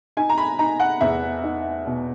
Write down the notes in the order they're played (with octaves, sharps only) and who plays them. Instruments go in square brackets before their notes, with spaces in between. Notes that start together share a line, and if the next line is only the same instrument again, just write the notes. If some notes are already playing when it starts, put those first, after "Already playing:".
[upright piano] D#4 G#5
A#5
B5
D#4 A#5
F#5
E2 E5
D#4
B2